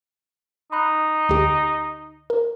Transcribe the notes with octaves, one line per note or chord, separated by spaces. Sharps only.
D#4 B5 F#6
D2 G4 D7
A#4